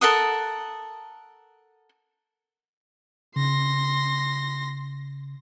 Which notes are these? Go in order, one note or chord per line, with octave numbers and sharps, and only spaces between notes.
A4 A#4 F#5 D#6
C#3 C6 A#6